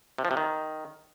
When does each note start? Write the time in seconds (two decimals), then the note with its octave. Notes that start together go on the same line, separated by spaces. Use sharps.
0.18 C3
0.25 F3
0.31 C3
0.37 D#3